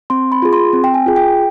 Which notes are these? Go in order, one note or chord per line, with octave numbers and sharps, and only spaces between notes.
C4 C6
B5
F4 G#4
C6
C4
G5
G#5
F4 G#4
G5